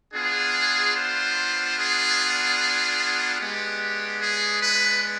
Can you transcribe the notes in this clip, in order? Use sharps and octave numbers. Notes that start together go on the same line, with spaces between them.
B3 D4 F4 G#4
C5
G#4
G#3 B3 D4 G4
G#4
B4